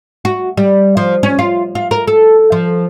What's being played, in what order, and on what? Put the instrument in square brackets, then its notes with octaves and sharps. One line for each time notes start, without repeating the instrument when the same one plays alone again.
[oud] F#4
G3
F3
C#4
F4
F4
A#4
A4
F3